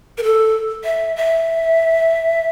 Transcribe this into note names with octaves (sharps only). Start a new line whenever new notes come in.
A#4
A4
E5
E5